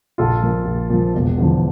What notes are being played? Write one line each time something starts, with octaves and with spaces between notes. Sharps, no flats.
A#1 F4 A4
A#2 F3
A#1
A#2 F3
E1
E2 D3 F3